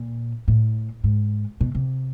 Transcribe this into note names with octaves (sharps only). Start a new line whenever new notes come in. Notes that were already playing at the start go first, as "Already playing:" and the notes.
Already playing: A#2
A2
G#2
B2
C3